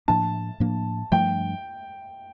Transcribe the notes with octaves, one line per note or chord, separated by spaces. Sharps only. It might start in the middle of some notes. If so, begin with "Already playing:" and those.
A2 F3 A#3 D4 A5
A2 F3 A#3 D4
G2 F3 A3 G5